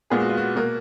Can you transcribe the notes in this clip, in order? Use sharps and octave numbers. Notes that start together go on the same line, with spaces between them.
A#2 G#3 B3 G#4
F#4
F4
F#4
B2 A#3